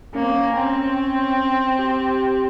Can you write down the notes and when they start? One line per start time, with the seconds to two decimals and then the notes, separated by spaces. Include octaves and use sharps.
0.15 A#3 C#4
0.22 C4
0.30 C#4
0.57 C4
1.79 G4